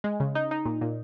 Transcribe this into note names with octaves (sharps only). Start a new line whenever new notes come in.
G#3
C#3
D#4
D#4
A#2
A#2